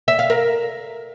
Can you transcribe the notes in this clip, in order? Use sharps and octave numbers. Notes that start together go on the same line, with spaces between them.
E5
F5
A#4